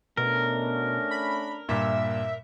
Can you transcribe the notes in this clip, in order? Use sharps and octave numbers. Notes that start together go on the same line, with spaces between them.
B2 A3 C#4 D4 A#4
B5
G2 A#2 E5